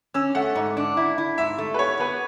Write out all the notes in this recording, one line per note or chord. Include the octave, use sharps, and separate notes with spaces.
C#4 E6
A3 F#5
G#2
D4
E4
E4
G#2 E5
A3
B4
B3 C#5
B3 B4